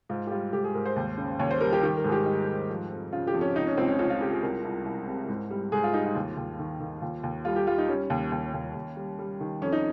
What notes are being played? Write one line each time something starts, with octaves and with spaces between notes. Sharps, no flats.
G#2 F4
G4
G3 F4
G#2 G4
G#4
G#2 A#4
C5
D#2
C#3
D#2 C#5
C5
G3 A#4
G4
D#3 G4
A#4
G#2 G#4
G4
G3 D#4
G#2
F3
F2
C#3 F4
G4
F2
C#4
C#2 D#4
C#4
C#2 C4
C#4
C#2 C#4
F4
C#2 G4
G#4
C2 A#4
C2
C2
C3
G#2
G3
G#2 G#4
F4
G3 D#4
F4
D#2
D#2
D#3
D#3
D#2 F4
D#2
G3 F4
G4
G3 F4
D#4
G3 C#4
D#2
D#2
D#2
D#2
G3
G3
D#3
F2 C#4
D#4